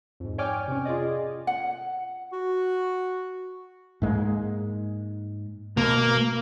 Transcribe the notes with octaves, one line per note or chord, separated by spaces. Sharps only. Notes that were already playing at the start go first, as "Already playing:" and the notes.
F2 G#2
C#5 D5 G5 G#5 D6 F6
C3 C#4
F4 G#4 D5 D#5
F#5
F#4
G#2 G#3 A#3
B2 A#3